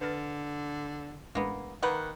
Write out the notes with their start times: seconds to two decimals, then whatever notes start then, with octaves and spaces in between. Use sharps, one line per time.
0.01 D3 B4 F6 A6
1.35 A1 G#3 A#3 B3 D4
1.83 D#3 A#3 B4 F#5